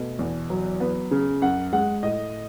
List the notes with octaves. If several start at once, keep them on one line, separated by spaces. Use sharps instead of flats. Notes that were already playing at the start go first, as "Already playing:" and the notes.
Already playing: B2 A3
E2
F#3
B3
C#3
F#2 F#5
G#3 F#5
A2 D#5